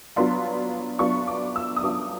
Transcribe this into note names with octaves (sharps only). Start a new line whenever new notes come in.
F#3 B3 D4 F4 C6
F#3 B3 D4 F4 C#6
D6
E6
D#6
F#3 B3 D4 F4 D6